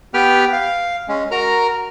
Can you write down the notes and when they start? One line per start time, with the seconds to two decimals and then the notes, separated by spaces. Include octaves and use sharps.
0.14 B3 G4 B4 G5 F6
0.53 F5
1.08 G#3 C#4
1.31 F#4 A#4 A#5 F6